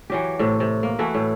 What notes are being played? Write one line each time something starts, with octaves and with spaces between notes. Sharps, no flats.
E3 F#3 G4
A2 C3
C3
A#3
E3 A3 E4 F#4
A2